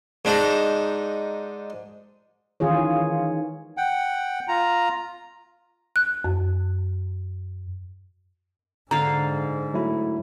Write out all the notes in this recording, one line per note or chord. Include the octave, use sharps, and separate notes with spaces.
G#2 D4 D#4
D#3 E3 F4 G#4 C#5
F#5 G5
F4 A#5
F#6
F#2
G#2 D3 F5 A#5
F#3 A3 E4